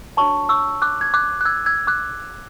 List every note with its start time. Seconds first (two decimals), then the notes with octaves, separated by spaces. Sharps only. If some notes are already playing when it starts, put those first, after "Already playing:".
0.17 D4 F#4 C#5 A5 C#6
0.49 C#6 E6
0.82 D6 F#6
1.01 G#6
1.14 D6 F#6
1.41 F#6
1.45 E6 G#6
1.66 E6 G#6
1.87 D6 F#6